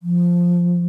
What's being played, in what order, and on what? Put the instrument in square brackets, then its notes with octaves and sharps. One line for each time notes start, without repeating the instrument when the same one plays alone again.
[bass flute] F3